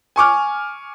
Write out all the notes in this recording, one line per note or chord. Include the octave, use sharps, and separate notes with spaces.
G#5 C#6 D6 F6